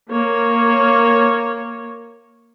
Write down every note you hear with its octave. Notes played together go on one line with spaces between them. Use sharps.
A#3 C#5